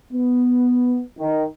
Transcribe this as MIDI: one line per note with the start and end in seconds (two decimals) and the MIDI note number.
0.13 1.01 59
1.19 1.44 51